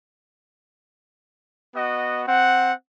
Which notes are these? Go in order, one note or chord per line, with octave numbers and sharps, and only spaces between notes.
B3 F#4 D#5
C4 F#5